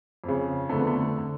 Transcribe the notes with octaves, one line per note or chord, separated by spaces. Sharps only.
F2 C#3
F2 D3 A3
B3
A3
D3